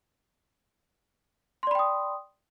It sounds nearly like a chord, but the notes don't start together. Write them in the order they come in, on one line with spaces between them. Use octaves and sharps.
C6 D5 B5 G5 D#6